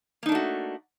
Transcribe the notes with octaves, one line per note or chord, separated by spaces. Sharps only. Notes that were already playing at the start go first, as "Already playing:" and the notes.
A3 A#3 D4 D#4 F#4